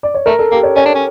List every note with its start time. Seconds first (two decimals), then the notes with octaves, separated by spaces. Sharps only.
0.03 D5
0.14 C#5
0.26 A3 A#4
0.39 A4
0.52 A#3 G4
0.63 C#5
0.76 C#4 C#5
0.86 D4
0.95 C#4